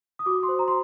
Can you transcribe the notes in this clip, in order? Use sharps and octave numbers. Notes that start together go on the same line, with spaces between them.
D#6
F#4 D6
C6
C5
A#5
C6